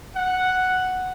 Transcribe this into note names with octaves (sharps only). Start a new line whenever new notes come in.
F#5